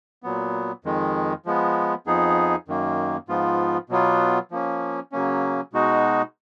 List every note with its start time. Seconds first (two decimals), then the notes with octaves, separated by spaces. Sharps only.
0.23 A#2 F#3 B3
0.85 F2 D#3 G#3
1.46 F3 G#3 B3
2.06 F2 F3 B3 D#4 G#4
2.68 F#2 D#3 A#3
3.29 G#2 F3 B3 F4
3.90 B2 F#3 B3 F4
4.51 F3 A#3 C#4
5.12 C#3 F#3 A#3 C#4
5.73 B2 G#3 D#4 F#4